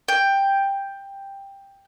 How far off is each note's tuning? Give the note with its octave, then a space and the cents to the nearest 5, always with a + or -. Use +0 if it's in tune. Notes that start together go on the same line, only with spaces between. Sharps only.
G5 +10